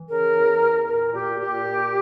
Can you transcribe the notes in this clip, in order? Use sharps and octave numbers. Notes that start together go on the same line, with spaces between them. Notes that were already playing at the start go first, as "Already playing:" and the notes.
Already playing: E3
C#3 A#4
E2
E2
A#2 A#4
A#2 G4
A#2 G4
A#2